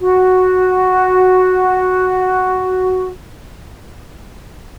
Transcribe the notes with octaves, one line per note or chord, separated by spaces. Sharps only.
F#4